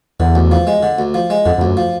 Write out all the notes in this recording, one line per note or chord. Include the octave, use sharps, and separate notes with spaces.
E2 D3
D2
F3
G#3
D3
D2
F3
G#3
F2 D3
F2
D2
F#2
F3